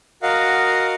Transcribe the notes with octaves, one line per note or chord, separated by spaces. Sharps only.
F#4 A#4 D#5 F5 F#5